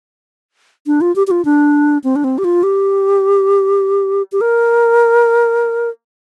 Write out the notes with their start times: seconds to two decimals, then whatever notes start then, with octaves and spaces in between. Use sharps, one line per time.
0.87 D4
1.01 F4
1.16 G4
1.27 G4
1.31 F4
1.45 D4
2.04 C4
2.16 D4
2.24 C4
2.38 G4
2.44 F4
2.63 G4
4.32 G4
4.41 A#4